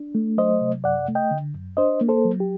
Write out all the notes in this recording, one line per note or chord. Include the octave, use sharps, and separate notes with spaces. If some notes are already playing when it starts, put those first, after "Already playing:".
Already playing: D4
A3
F#3 C5 D#5
C3
F#2 D5 F#5
A3
D#5 G5
D3
F#2
D4 C5 D#5
A#3
A4 C5
F#3
G4